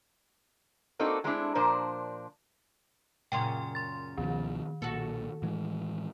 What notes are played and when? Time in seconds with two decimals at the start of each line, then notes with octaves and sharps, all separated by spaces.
0.99 A#3 C4 D4 D#4 F#4 A4
1.24 F#3 G#3 A3 C4 D4 E4
1.55 A#2 F3 D4 A#4 C5
3.32 F#2 A#2 C#3 G5 C6
3.75 C6 A6
4.17 C#2 B2 D#3 F3
4.82 B1 A#2 F#4 A4
5.42 A2 E3 G#3